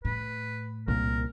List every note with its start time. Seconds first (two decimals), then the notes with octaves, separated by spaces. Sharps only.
0.05 A2 B4
0.88 C2 A#2 A#4